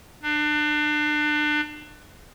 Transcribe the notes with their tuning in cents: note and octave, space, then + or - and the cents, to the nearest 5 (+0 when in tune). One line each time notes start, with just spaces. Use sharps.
D4 +30